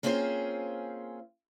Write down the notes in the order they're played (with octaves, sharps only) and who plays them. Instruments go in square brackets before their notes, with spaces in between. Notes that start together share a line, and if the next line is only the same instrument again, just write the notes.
[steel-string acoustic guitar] A#3 C4 C#4 F4 G#4 C5